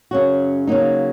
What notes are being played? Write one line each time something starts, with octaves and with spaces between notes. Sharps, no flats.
F#2 C#3 F#3 C#4 F#4
C#3 F#3 A#3 D#4